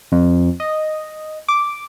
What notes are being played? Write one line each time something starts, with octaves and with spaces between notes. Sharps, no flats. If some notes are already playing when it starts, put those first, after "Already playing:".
F2
D#5
D6